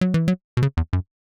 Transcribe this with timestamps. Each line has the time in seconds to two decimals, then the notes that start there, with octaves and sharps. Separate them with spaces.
0.01 F#3
0.14 E3
0.28 F#3
0.57 B2
0.63 C#3
0.77 E2
0.93 F#2